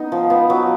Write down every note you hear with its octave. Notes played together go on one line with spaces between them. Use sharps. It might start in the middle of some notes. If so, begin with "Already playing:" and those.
Already playing: B3 D#4
F3
B3
F#3